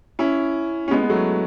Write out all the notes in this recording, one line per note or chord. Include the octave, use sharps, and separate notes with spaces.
C#4 E4
C#4
G#3 B3
B3
F#3 A3